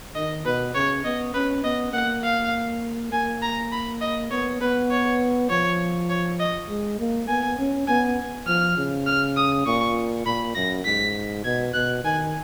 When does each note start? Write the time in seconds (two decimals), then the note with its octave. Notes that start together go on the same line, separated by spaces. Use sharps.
0.15 D#3 D#5
0.45 B2 B4
0.75 C#3 C#5
1.04 B3 D#5
1.34 C#4 B4
1.64 B3 D#5
1.93 A#3 F#5
2.24 F5
3.12 A#3 G#5
3.42 A#5
3.72 B5
4.01 D#5
4.31 B3 C#5
4.61 B3 B4
4.91 C#5
5.50 F3 C#5
6.10 C#5
6.40 D#5
6.69 G#3
6.99 A#3
7.28 B3 G#5
7.58 C#4
7.87 B3 G#5
8.47 F3 F6
8.77 C#3
9.07 F6
9.37 D#6
9.66 A#2 C#6
10.26 A#2 B5
10.55 F#2 A#6
10.85 G#2 B6
11.44 B2 G#6
11.74 B2 F#6
12.04 D#3 G#5